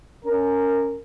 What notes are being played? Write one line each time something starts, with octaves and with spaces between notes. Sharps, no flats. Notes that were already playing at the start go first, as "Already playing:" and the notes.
C#4 A#4